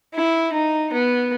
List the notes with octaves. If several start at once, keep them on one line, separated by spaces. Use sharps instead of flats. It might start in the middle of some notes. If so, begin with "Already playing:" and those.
E4
D#4
B3